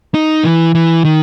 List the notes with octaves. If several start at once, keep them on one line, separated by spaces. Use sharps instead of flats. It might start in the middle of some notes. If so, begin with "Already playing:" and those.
D#4
E3
E3
D#3